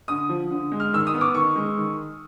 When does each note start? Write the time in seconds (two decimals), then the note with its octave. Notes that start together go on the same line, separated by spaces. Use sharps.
0.08 D3 D#6
0.29 F3
0.51 D3
0.72 G#3
0.80 F6
0.93 D#3 E6
1.07 D#6
1.14 B3
1.21 D6
1.34 D#3 C#6
1.55 G#3
1.77 D#3